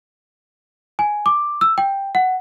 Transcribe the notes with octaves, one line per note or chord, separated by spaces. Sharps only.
G#5
D6
E6
G5
F#5